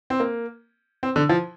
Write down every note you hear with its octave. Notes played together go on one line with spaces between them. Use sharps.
C4
A#3
C4
D3
F3